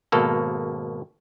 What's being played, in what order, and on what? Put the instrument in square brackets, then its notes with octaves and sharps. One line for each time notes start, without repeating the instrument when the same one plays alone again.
[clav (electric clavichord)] G#1 B2 A#3 A4